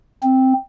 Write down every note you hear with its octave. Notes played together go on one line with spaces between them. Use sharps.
C4